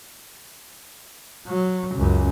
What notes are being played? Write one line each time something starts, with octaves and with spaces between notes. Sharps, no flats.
F#3
C#2 F#2